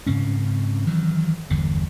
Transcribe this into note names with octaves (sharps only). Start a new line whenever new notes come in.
G#2 C#3 C4 C#4
D#3 E3 F#3
G1 E2 D3